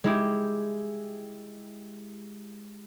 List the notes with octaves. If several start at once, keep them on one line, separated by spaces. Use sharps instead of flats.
G#3 E4 G4